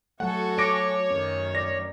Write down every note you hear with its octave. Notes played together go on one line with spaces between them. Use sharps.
F#3 A3 F#4 A4 F#5 G#5
C#5 D6 A#6 D7
F#2 D#3 C#4
D5 A#6